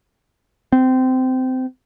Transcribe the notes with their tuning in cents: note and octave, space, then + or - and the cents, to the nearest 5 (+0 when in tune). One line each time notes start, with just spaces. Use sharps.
C4 -20